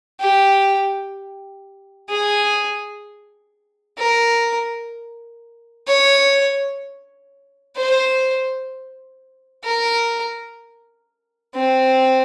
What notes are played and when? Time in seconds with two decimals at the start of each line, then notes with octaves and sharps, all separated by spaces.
0.20 G4
2.10 G#4
3.98 A#4
5.87 C#5
7.77 C5
9.65 A#4
11.55 C4